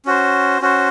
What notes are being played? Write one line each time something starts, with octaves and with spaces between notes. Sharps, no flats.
C#4 F#4 C5
C#4 F#4 C5